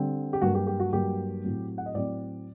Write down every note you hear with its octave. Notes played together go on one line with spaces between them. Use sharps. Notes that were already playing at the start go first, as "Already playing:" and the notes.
Already playing: D3 G3 C4
G4
G2 F#3 A#3 F#4
G4
G4
F#4
G2 F#3 A#3 G4
A2 F#3 C4
F#5
D#5
A2 F#3 C4 D5